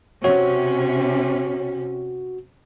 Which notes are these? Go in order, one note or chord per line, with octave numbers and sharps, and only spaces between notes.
C3 C#4 F#4 C#5